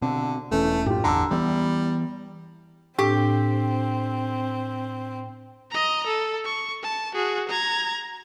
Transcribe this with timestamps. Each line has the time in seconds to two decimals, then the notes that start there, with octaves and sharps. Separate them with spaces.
0.02 B2 D3 C4 D4
0.52 E1 E3 A3 C#4
0.87 A#1 F#2 A2 F4 G4
1.04 G1 E2 D3 A#5 E6
1.31 E3 F#3 G3 B3
2.99 A2 C4 D4 G4
5.71 D#5 A#5
6.07 A4
6.45 C#6
6.83 A5
7.15 F#4 G#4
7.49 A#5 G#6